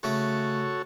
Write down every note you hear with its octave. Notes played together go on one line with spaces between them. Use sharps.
C#3 A3 F#4 A4 C#5